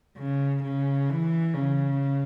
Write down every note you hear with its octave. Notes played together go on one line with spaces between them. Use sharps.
C#3
C#3
E3
C#3